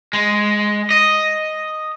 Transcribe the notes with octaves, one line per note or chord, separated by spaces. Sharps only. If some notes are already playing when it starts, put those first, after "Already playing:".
G#3
D#5